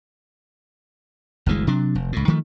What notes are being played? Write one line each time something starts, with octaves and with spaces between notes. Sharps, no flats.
G1 D2 E3 G#3
C3 F#3 D4
F1
C#2 A2
D#3 F3 A3